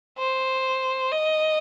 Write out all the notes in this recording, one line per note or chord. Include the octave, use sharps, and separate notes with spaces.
C5
D#5